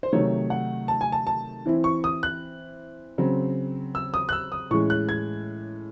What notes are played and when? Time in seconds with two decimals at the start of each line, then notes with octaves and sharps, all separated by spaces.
0.03 C5
0.13 C3 D#3 F#3 A3 D#4 C#5
0.50 F#5
0.88 A5
1.01 G#5
1.12 A5
1.27 A5
1.66 E3 C4 E4
1.84 C#6
2.04 D#6
2.23 F#6
3.18 C#3 F#3 C4
3.95 E6
4.14 D#6
4.29 F#6
4.33 E6
4.52 D#6
4.71 A2 E3 G#3 C#4 C#6
4.90 F#6
5.09 G#6